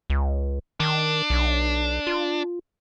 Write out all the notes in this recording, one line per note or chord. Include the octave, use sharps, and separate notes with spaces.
C#2
D#3 D4
B1
F4